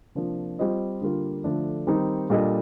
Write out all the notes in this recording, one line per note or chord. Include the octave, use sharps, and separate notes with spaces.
C3 F3 A#3 D4 F4
G3 C4 F4 C5 D#5
D3 G3 A#3 F4
D3 F3 A3 D4
D#3 G3 C4 D#4
A#2 G3 D4 A4 D#5